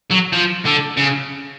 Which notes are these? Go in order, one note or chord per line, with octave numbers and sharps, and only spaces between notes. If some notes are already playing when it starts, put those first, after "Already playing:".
F#3
F3
D3
C#3